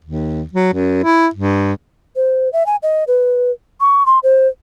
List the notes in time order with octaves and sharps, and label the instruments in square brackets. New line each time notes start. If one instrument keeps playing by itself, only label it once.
[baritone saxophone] D#2
F#3
F#2
E4
G2
[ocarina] C5
E5
G#5
D#5
B4
C#6
C6
C5